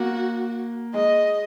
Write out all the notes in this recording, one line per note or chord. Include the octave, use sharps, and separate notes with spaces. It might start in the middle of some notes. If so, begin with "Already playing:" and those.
Already playing: A#3 F#4
G#3 D#5